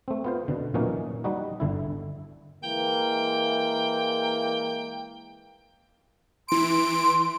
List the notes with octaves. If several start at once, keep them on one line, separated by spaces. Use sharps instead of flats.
A3 C4
B3 F4 C5
B2 D3
A#2 E3 F#3 A#3 C#4 D#4
G3 D#4 F#4
G1 D3 E4
E3 G#3 A#3 G5
E3 C6 D7